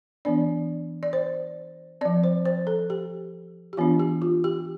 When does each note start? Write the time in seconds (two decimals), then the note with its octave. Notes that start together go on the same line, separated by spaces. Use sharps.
0.25 E3 B3 D4 D5
1.03 D5
1.13 C5
2.01 F3 C4 D5
2.24 C5
2.45 C5
2.67 A4
2.90 G4
3.73 G4
3.77 E3 B3 D4 F4
4.00 G4
4.22 F4
4.44 G4